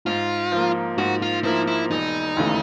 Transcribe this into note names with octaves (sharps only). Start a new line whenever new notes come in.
G#2 F4
F3 A#3
G#2 F#4
F4
F3 A#3 E4
E4
E1 D#4
D#2 C#3 E3 A3